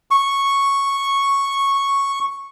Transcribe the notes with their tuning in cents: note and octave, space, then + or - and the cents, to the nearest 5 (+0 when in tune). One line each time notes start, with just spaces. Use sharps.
C#6 -5